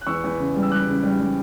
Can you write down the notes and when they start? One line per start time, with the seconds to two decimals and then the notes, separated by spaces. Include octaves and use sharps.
0.01 F#6
0.07 E2 C#6 E6
0.24 E2
0.39 C#3
0.56 G3
0.62 E6
0.71 G3 D6 F#6
0.88 C#3
1.03 G3
1.20 G3